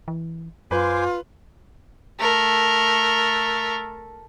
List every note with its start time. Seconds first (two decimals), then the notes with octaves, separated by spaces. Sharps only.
0.08 E3
0.71 F#2 F4 B4 C5 G#5 D6
2.20 A3 A#4